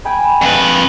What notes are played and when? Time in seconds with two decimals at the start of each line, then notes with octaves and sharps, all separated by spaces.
0.05 G5 G#5 B5
0.43 F2 B4